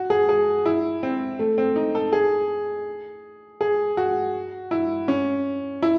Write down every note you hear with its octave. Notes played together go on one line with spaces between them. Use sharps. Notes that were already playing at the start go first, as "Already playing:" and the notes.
Already playing: F#4
G#4
G#4
E4
C4
A3
C4
D#4
A4
G#4
G#4
F#4
E4
C#4
E4